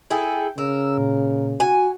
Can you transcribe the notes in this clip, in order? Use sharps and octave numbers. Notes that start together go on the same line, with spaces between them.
E4 G#4 A4 G5
C#3 A#4 E6
A#2
F#4 G#5